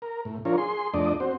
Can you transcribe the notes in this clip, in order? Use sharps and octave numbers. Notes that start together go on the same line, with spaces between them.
A#4
A2
F3 D4 F4 A#4 C#5
G#4 C6
F2 A3 D4 D5 D#5
C4 F#4 C5